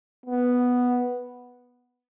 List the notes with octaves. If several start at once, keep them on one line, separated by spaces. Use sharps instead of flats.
B3